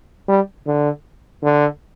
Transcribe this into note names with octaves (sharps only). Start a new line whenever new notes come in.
G3
D3
D3